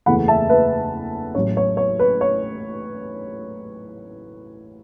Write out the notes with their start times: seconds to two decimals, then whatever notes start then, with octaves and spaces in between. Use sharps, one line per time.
0.06 F#1 E2 E3 A3 F#5 B5
0.28 E5 A5
0.49 B4 E5
1.35 A1 A2 F#3 C#5
1.57 C#5
1.77 C#5
1.99 B4
2.21 C#5